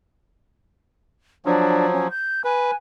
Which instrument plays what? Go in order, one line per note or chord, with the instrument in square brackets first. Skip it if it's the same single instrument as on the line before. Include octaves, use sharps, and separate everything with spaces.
[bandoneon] F3 F#3 [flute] D4
[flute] C#4
G6
[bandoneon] B4 [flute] G#5